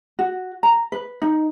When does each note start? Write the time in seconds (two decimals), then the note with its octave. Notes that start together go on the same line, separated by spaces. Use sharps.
0.19 F#4
0.63 A#5
0.92 B4
1.22 D#4